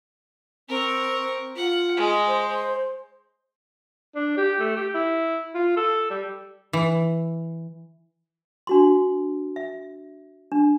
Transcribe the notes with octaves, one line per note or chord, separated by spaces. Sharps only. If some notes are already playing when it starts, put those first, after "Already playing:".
C4 A#4 C#6
F4 F#5
G#3
C5
D4
G4
A3
G4
E4
F4
A4
G3
E3
D4 F#4 C6
E5
D4